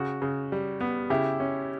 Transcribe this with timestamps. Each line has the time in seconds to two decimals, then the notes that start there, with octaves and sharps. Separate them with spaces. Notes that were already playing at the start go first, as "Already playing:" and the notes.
Already playing: C#3 F#4
0.22 C#3
0.52 G3
0.81 B3
1.10 C#3 E4 G4
1.40 C#4